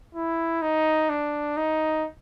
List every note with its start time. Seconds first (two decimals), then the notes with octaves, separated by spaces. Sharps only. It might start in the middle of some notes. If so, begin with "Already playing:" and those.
0.15 E4
0.62 D#4
1.09 D4
1.57 D#4